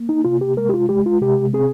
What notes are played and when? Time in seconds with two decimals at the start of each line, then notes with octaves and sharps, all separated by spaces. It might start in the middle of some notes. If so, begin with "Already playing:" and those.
Already playing: A#3
0.09 D#4
0.24 C3 F4
0.41 G4
0.57 G#3 A#4
0.69 G4
0.74 F4
0.89 G#3 G4
1.06 F4
1.21 C3 G4
1.53 C4 G#4